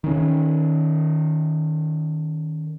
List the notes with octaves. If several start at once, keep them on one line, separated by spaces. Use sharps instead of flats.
D#3 C#4